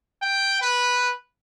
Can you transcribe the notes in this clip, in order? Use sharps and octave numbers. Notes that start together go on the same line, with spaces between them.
G5
B4